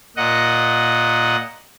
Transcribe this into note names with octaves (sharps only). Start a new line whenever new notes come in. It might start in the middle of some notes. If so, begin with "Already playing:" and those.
A#2 D#5 F#5